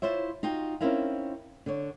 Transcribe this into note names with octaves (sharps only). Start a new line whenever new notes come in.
E4 F4 C5 C#5 E5
D#4 F4 F#4 G5
C4 C#4 D#4 E4 A#4 F5
D3 C#5